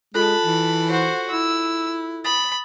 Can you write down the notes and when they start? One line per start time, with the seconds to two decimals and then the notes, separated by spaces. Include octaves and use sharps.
0.14 G#3 F4 A4 A5 B5 F#6
0.44 E3
0.89 F#4 C5
1.30 E4 E6
2.24 B5 D#6 A6